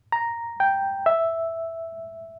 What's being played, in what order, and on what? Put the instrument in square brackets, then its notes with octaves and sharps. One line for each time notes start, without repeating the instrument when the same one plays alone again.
[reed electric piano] A#5
G5
E5